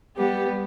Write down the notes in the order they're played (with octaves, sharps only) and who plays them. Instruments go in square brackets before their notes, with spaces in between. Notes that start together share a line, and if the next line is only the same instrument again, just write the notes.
[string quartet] G3 B3 [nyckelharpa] G4